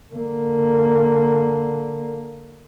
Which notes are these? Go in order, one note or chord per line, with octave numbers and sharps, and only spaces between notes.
D3 A#3